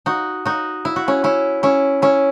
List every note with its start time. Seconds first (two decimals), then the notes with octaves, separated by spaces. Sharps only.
0.06 D#4 F#4
0.45 D#4 F#4
0.85 E4
0.96 F#4
1.08 C#4 E4
1.24 C#4 E4
1.63 C#4 E4
2.02 C#4 E4